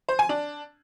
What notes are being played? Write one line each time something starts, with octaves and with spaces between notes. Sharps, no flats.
C5
G#5
D4